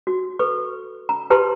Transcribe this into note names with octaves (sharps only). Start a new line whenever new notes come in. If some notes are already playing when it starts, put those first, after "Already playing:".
F#4
A4 B4 C#6
A#5
E4 G4 B4 A5 A#5 C6